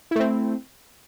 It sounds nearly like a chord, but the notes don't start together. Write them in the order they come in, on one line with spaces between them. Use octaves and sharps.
E4 A3 C4